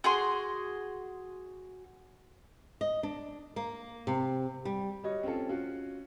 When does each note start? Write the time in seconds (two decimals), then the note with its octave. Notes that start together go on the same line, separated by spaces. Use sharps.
0.04 F#4 G#4 C6
2.81 D#5
3.03 D4
3.56 A#3
4.07 C3
4.65 G3
5.04 G3 F#4 C#5 D#5
5.23 C4 C#4 F4 A4
5.48 C#4 F4 F#4